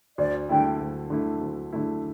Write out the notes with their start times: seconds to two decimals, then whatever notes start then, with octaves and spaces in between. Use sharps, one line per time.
0.18 D2 D5
0.49 D3 A3 E4 G5
0.80 D2
1.10 D3 A3 E4
1.41 D2
1.73 D3 A3 E4